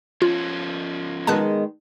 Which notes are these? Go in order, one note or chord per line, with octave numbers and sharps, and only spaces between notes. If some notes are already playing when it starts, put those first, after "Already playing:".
F3 C#4 F4
D#3 G#3 B3 A5 F#6